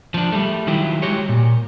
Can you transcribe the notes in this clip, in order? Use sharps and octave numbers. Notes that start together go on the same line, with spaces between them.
F3 D4
G3 A3
D#3 F#3 E4 F4 G4
G3 G#3 F#4 G4 C#5
A#2